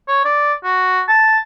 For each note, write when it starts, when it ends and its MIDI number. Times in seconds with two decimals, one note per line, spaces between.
0.08 0.24 73
0.25 0.53 74
0.64 1.01 66
1.09 1.38 81